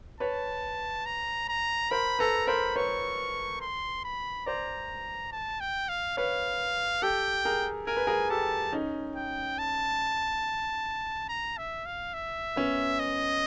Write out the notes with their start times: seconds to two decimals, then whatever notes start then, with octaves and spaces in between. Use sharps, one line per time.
0.20 B4 C#5 A5
1.06 A#5
1.48 A#5
1.91 A#4 C5 B5
2.19 A4 B4 A#5
2.47 A#4 C5 B5
2.76 B4 C#5 C#6
3.61 C6
4.05 B5
4.46 C5 D5 A#5
5.32 A5
5.60 G5
5.89 F5
6.17 B4 C#5 F5
7.02 G4 A4 G5
7.45 G#4 A#4
7.87 A#4 G#5
7.97 B4
8.07 G#4 A#4
8.30 G4 A4 A5
8.73 C#4 D#4
9.16 G5
9.58 A5
11.29 A#5
11.57 E5
11.86 F5
12.14 E5
12.56 B3 C#4
13.00 D#5